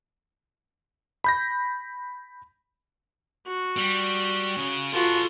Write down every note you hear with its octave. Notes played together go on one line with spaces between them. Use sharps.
B5 G6 A#6
F#4
G3
C#3
F4 F#4 A4 B4